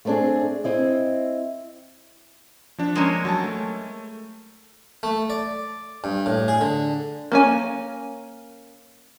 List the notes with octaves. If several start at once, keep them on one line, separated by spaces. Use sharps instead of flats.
A3 B3 C4 D4 G#4
C4 E4 D#5
F3 D4
G#3 A#3 C#4
F#3 A5
A3
A3
D5
G2
A2
G#4
D3
A#3 C#4 G#5